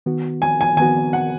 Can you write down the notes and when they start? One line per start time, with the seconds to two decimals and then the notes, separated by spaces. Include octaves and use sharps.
0.06 D#3 B3 F#4
0.42 G#5
0.61 G#5
0.77 D#3 B3 F#4 G#5
1.13 F#5